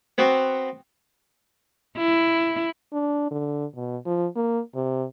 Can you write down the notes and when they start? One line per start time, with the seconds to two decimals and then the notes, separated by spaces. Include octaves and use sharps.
0.18 B3 C4 F#4
1.98 E4
2.92 D4
3.31 D3
3.75 B2
4.05 F3
4.36 A#3
4.74 C3